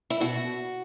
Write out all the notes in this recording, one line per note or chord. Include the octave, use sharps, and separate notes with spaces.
E4
B2 F#4